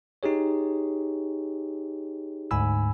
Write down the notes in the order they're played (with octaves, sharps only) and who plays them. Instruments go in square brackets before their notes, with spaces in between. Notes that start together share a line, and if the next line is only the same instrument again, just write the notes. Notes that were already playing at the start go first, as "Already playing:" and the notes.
[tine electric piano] D#4 G4 G#4 C#5
D2 G#2 G#5 B5 E6